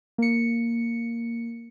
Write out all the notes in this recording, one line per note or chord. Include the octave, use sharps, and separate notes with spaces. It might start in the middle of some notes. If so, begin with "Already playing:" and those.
A#3 C#7